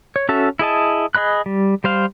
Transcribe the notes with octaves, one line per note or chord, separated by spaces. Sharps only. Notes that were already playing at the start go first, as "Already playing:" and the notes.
C#5
C#4 F#4 A4 E5 A5
E4 G#4 D#5 A5
G#4 D#5 B5 F#6
G3
G3 C5 F5